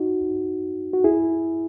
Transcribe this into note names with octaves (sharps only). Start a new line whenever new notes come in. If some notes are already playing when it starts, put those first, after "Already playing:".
Already playing: D#4 F#4
F#4
E4 G#4